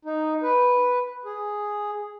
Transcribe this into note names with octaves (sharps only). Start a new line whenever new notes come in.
D#4
B4
G#4